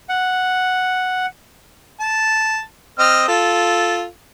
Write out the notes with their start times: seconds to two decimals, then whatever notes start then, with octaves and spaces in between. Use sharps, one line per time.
0.09 F#5
2.00 A5
2.99 C4 D#5 F6
3.28 F4 A4